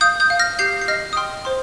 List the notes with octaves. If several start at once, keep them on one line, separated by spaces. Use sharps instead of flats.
F5 D#6 G6
D#6 G6
F5
F6 A#6
G4 G6 C7
C7
D#5 F6 A#6
D#6
G5 C6 F6
C5 C6